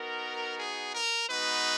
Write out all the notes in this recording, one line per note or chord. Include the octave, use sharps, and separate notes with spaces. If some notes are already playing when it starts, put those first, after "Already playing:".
Already playing: B3 D#4 F#4 A#4
G#4
A#4
G#3 B3 D#4 F#4 B4